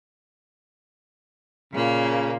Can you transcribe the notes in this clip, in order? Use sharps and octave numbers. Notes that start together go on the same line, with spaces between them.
A#2 C#3 A#3